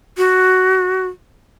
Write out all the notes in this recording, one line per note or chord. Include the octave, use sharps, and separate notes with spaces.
F#4